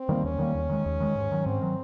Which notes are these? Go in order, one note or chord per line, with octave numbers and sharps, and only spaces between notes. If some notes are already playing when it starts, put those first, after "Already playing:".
Already playing: C4
D#3 G3 A#3
D#2 C#4
D#3 G3 A#3
D#2
D#3 G#3
D#2
D#3 G#3
G#2
D#3 F#3
G#2 C4
D#3 F#3